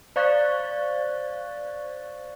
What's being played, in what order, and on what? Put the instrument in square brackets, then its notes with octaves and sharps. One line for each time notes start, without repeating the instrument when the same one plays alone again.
[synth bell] C5 D5 F5 C#6 F#6 A6